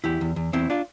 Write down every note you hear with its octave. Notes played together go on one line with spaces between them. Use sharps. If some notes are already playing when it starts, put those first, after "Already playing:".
E2 E4 G4
E2
E2
E2 C4 E4
D4 F4